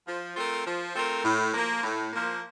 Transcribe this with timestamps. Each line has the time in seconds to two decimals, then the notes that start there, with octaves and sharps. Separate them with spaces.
0.07 F3
0.37 A3 C4 F4 A#4
0.67 F3
0.96 A3 C4 F4 A#4
1.24 A2
1.54 F3 A#3
1.84 A2
2.13 F3 A#3